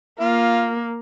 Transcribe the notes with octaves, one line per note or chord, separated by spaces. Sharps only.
A#3 F4